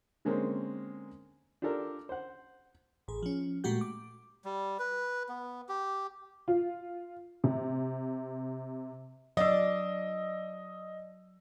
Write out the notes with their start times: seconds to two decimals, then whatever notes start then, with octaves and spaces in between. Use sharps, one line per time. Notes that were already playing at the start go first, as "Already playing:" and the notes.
0.25 D3 G#3 A#3 C4 C#4 A#4
1.62 D4 F4 G4 A4 A#4 D5
2.09 C5 F#5
3.08 A1 G#4
3.23 F3 C#4
3.64 A#2 G#3 A3 F#4 G4 G6
3.81 D6
4.45 G3
4.79 B4
5.29 B3
5.69 G4
6.48 F4
7.44 C3
9.37 F#3 D4 D5 D#5 E6